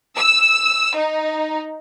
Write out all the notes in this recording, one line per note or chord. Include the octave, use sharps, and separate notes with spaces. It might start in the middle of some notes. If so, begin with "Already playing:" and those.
E6
D#4